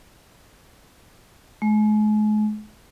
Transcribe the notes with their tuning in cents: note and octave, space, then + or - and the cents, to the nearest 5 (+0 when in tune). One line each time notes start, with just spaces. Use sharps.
G#3 +40